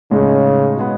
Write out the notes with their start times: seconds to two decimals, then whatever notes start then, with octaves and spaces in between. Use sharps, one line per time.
0.11 A2 C#3 G#3 D#4
0.77 B2 G#3 B3